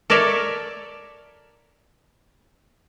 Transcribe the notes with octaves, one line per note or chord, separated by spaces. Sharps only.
A4 A#4 C#5 D5 E5 A5